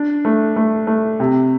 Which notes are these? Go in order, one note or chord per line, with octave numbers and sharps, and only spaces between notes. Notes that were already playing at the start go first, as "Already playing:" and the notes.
Already playing: D4
A3
A3
A3
C3